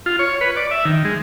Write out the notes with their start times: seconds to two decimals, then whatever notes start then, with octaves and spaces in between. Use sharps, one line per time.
0.06 F4
0.19 C#5
0.41 B4
0.56 D5
0.71 E5
0.85 D#3
1.05 G#3